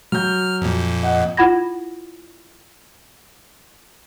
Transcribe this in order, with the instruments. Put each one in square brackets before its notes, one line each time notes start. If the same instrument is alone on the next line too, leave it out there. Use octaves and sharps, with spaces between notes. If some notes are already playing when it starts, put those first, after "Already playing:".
[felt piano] F#3 G6 [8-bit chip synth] F6
[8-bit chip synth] F2 A#2
[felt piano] D#5 F#5
[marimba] E4 F4 F#5 B5 G#6 A#6